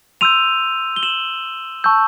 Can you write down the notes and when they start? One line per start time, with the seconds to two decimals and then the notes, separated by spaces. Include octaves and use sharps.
0.21 C6 E6 G6 D#7 F7
0.96 G7
1.03 E7 F#7
1.84 A5 C#6 E6 G6